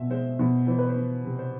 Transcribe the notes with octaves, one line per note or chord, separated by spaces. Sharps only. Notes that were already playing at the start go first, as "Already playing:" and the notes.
Already playing: B2 C4 E5
G#3 C5
B2
E3 C5
B4
C5
B3
C3
C5